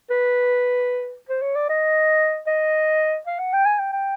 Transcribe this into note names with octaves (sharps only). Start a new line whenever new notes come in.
B4
C5
C#5
D5
D#5
D#5
F5
F#5
G5
G#5
G5
G5